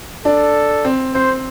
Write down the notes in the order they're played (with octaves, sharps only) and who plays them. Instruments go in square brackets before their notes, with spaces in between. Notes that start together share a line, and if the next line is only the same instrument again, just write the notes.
[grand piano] D4 [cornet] A4
[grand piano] C4
[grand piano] C4 [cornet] C5